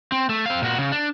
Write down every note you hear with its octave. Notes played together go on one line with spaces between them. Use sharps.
C4
A3
C4 F5
A#2 F#4
C#3
D4